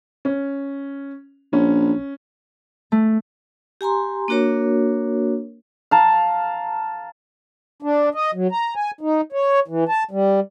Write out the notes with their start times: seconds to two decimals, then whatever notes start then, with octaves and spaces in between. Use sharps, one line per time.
0.25 C#4
1.53 A#1 C#4
2.92 A3
3.81 G4 G#5 A#5 C6
4.28 A#3 D4 F#4 A#4 C#5
5.91 F5 A5 A#5
7.82 D4
8.15 D#5
8.34 F#3
8.51 A#5
8.76 G#5
9.01 D#4
9.32 C#5
9.68 E3
9.89 A5
10.11 G3